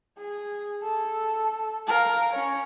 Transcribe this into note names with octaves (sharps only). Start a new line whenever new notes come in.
G#4
A4
A#4 F5
C#4 C#5